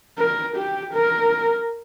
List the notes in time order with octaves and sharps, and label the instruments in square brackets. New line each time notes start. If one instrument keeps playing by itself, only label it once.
[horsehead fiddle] A#4
G4
A#4